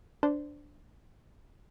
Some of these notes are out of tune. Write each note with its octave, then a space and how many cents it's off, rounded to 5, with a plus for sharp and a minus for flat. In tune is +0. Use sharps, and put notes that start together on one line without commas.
D4 +0 C5 -15